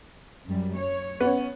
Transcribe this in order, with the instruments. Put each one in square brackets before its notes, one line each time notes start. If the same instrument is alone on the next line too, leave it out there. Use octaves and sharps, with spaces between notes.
[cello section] F#2 G3
C#5
[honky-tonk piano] B3 C#4 [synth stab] B4